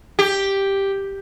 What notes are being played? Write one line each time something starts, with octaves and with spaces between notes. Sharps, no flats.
G4